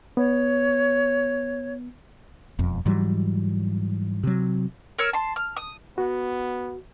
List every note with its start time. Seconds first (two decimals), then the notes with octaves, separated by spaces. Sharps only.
0.17 B3 C#5
2.59 E1 F2
2.86 G#2 E3 F#3 G3
4.23 C3 F#3
4.99 A#4 C#5 E6
5.13 A5 C6
5.36 F6
5.57 D#6
5.98 B3 F#4